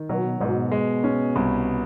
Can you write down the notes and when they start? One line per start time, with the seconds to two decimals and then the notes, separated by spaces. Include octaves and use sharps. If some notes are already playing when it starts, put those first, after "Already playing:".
Already playing: D#3
0.09 B2 F#3
0.40 G#2 B2
0.72 G#3
1.04 C#4
1.36 C2